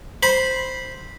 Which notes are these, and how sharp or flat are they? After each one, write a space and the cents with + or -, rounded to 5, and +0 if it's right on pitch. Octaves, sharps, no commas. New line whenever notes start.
C5 -5 B5 -15